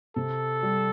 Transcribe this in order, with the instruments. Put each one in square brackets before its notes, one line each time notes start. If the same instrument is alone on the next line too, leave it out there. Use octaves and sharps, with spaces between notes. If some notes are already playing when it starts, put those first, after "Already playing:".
[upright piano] C3 [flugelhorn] A4
[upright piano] G3